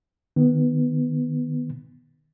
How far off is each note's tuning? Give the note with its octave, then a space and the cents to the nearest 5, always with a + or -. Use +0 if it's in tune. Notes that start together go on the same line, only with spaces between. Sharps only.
D#3 -25 B3 +0